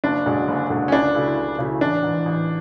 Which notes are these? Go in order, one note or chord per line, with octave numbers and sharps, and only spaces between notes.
F#1 D4
F#2 D3 G#3
F#1
F#2 D3 G#3
C#4
C#2 D4
C#3 F#3 A3 E4
C#2
C#3 F#3 A3 E4
A1 D4
G#2 E3
A1